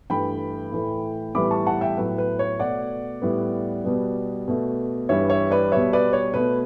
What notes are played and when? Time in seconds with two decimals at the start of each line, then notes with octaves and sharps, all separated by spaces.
0.10 G2 E3 A3 G5 B5
0.72 A2 E3 A3
1.35 A2 E3 G3 B3 B5 D6
1.51 A5 C#6
1.66 F#5 A5
1.81 E5 G5
1.97 A2 F#3 B3 B4
2.18 B4
2.39 C#5
2.60 B2 A3 D5 F#5
3.22 A2 G3 B3
3.85 B2 G3 B3
4.48 B2 A3
5.09 G2 E3 G3 C#5 E5
5.30 C#5 E5
5.51 B4 D5
5.72 B2 G3 B3 C#5 E5
5.93 B4 D5
6.13 C#5
6.34 B2 A3 B4